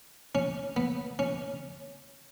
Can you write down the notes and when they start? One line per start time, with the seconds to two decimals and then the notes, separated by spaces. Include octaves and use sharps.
0.35 C#4
0.76 B3
1.19 C#4